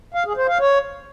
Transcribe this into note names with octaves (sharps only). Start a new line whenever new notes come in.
F5
G#4
C5
F5
C#5